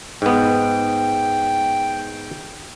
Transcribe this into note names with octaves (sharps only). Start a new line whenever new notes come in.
G#2 B3 G5